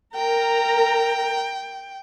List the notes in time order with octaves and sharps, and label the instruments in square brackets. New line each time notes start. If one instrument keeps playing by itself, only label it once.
[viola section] A#4 A#5 [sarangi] G5